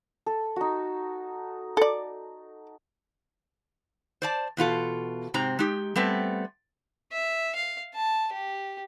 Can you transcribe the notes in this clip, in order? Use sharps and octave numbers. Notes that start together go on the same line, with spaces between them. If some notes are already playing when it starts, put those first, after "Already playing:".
A4
D#4 F#4
A4 D5
C5 D5 A5
E2 B2 F4 A4
G#2 C3 C4 A#5
G#3 D#4 G4
G3 A3 B3 C4
E5
F5
A5
G4